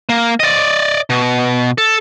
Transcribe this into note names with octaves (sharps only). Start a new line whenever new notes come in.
A#3
D5 D#5
B2
A4